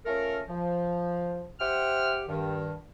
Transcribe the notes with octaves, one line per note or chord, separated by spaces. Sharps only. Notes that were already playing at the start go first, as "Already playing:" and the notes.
A3 C#4 F4 A4 A#4
F3
G4 C5 E5 F#5 G5 F6
G2 D#3